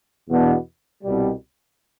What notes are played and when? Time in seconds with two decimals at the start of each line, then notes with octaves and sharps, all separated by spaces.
0.28 E2 B2 B3 D4
1.03 C2 B2 G3